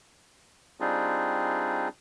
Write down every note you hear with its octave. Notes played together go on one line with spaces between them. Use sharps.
G3 C4 D4 D#4 F4 G#4